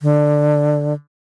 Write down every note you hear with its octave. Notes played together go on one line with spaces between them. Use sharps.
D3